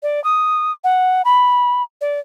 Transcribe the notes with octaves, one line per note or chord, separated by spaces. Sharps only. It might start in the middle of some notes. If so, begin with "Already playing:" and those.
D5
D#6
F#5
B5
D5